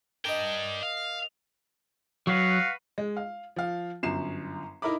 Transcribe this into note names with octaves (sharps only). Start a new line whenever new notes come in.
D4 A#4 D#5 G5
F5
F#3 F#4 B4 F5
G#3
F5
F3 F5
G1 F#2 C7 E7
D#4 E4 A#4 E5 B5 D6